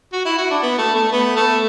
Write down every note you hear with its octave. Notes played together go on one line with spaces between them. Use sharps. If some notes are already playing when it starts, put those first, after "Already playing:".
F#4
E4
F#4
D4
B3
A3
A3
B3
A3